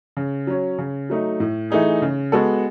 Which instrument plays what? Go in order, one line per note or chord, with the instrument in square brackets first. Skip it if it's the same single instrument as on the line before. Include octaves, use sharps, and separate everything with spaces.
[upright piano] C#3
F#3 C#4
C#3
F#3 A3 D#4
A2
E3 A3 D#4 G#4
C#3
G#3 B3 F#4 A4